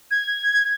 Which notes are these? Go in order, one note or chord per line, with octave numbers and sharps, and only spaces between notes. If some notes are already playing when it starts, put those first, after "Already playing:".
G#6